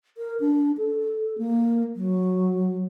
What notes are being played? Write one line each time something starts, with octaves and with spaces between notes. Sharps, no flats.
A#4
D4
A4
A#3
F#3